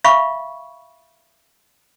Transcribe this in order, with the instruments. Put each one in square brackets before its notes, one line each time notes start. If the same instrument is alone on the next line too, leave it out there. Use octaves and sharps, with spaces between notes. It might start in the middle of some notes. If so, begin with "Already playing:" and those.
[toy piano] E5 F5 B5 C#6